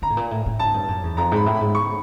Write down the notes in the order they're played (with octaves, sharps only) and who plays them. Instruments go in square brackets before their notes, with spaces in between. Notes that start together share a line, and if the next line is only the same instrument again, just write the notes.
[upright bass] D3 [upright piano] A#5
[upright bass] A2
A#2
A2
A2
[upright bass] G#2 [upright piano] A5
[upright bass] G2
F#2
E2
[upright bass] F2 [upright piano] A#5
[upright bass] G#2 [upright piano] B5
[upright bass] A2
[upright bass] G#2 [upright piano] B5
[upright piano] C#6